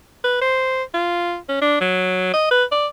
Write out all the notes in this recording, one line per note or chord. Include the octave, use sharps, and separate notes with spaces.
B4
C5
F4
C#4
D4
F#3
D#5
B4
D5